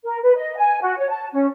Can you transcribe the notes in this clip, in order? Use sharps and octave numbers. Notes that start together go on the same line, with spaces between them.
A#4
B4
D#5
G#5
F#4
C#5
A5
C#4